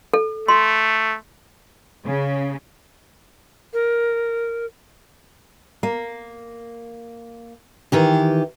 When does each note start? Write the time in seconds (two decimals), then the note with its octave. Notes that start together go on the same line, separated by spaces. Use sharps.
0.14 A4
0.48 A3 C6
2.05 C#3
3.73 A#4
5.83 A#3
7.92 D#3 E3 G4